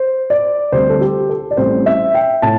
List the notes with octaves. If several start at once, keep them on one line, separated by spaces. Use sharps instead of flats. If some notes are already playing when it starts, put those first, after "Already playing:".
Already playing: C5
D5
D2 D3 G3 C4 C5
A4
G4
A4
D5
A1 A2 G3 C4 C5
E5
G5
A2 A5